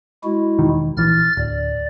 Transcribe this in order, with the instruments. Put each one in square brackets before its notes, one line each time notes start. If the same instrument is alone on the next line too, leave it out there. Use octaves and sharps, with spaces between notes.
[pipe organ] G#3 E4 F#4
[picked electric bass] E1 D#3
[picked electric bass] A#1 E3 [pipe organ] F6 A6
[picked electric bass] D1 [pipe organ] D5